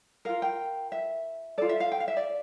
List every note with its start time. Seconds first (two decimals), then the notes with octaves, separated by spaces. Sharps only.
0.25 F4 A#4 F5
0.42 G5
0.92 E5
1.58 F4 A4 D5
1.69 E5
1.80 F5
1.92 G5
2.00 F5
2.08 E5
2.17 D5